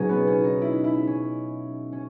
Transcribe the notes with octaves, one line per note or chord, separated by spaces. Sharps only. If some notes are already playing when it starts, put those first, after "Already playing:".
Already playing: B2 F#3 C#4 D#4 F#4 G#4
B3
C#4
D#4
E4
E4
C#4
C#4